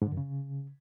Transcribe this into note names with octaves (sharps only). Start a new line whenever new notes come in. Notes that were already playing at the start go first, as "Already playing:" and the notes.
G#2
D3
F#2
C#3